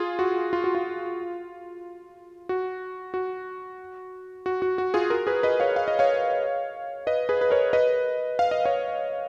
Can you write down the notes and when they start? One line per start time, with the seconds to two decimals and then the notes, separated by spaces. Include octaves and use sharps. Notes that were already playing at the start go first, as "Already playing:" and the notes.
Already playing: F4 G#4
0.19 F#4
0.53 F4
0.64 F#4
0.75 F4
2.49 F#4
3.14 F#4
4.46 F#4
4.62 F#4
4.78 F#4
4.94 F4 G#4
5.10 F#4 A#4
5.27 G#4 B4
5.43 B4 D#5
5.60 C#5 F5
5.76 F5
5.88 D#5
5.99 C#5 F5
7.07 B4 D#5
7.29 G#4 B4
7.41 B4
7.51 A#4 C#5
7.73 B4 D#5
8.39 F5
8.51 D#5
8.65 C#5 F5